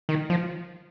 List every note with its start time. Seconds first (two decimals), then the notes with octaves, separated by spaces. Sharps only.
0.09 D#3
0.30 F3